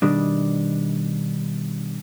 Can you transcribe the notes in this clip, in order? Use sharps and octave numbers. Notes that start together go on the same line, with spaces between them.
B2 D#3 G3 D4